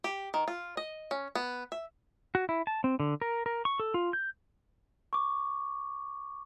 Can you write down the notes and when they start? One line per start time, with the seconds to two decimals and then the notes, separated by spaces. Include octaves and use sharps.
0.04 G4
0.34 D#3
0.48 F4
0.77 D#5
1.11 C#4
1.35 B3
1.72 E5
2.35 F#4
2.49 E4
2.67 A5
2.84 C4
3.00 D3
3.21 A#4
3.46 A#4
3.65 C#6
3.80 A4
3.94 F4
4.13 G6
5.13 C#6 D6